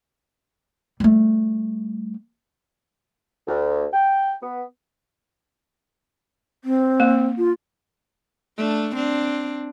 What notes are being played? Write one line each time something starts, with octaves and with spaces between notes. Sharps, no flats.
G3 A3
D2
G5
B3
C4
A#3
F4
A3 D4
C4 D4